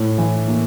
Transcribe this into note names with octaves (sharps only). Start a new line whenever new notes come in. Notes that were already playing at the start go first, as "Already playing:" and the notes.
Already playing: A2
E3
A#3